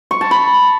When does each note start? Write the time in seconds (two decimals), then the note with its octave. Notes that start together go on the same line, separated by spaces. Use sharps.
0.11 C#6
0.21 A5
0.31 B5